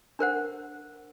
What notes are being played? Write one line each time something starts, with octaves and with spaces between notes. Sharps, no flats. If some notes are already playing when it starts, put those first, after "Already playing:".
D4 A#4 C5 F#5